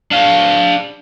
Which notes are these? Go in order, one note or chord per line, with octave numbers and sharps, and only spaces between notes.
D4 F5